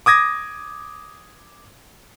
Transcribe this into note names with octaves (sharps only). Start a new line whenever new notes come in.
D6 D#6 G#6 A#6